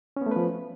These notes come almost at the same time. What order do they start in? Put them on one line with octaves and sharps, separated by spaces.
C#4 B3 A3 B4 F3